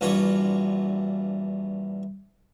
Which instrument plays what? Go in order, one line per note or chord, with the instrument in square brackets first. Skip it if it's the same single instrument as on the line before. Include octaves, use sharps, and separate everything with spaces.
[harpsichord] A#1 G2 E3 F4 F#4 C#5